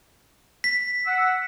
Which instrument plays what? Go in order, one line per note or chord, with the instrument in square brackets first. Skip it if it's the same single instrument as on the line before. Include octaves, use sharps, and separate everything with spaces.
[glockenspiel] B6
[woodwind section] F#5 E6